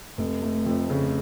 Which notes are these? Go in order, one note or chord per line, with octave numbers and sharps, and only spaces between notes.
F1
A3
F2
C#3